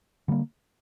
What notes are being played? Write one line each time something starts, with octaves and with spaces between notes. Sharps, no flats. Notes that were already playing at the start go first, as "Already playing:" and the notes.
D3 G3 A#3